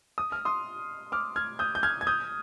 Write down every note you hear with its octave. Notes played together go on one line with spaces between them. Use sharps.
D#6
F6
C6 D#6
D6 F6
F6 G#6
D#6 G6
G6
F6 G#6
G#6
D#6 G6